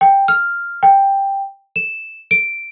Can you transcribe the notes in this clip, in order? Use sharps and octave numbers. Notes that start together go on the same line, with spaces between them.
G5
F6
G5
E7
D7